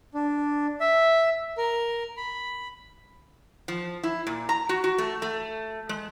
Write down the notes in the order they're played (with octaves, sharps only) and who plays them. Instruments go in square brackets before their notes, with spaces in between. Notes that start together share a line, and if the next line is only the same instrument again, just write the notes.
[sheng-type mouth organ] D4
E5
A#4
B5
[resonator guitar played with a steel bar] F3
E4
A#2
A#5
F#4
F#4
A3
A3
G#3